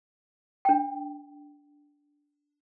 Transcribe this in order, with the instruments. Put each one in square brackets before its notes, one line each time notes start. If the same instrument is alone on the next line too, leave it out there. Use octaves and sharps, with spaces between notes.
[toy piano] D4 G5